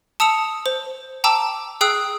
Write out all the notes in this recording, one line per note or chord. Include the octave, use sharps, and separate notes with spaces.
A5 D#6 E6 C#7 F7
C5
G5 A5 A#5 D6 E6
G#4 G5 D#6 E6 F#6 C7